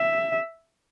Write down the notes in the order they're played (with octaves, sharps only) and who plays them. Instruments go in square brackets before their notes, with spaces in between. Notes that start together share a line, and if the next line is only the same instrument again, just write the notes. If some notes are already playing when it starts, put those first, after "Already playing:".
Already playing: [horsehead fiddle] E5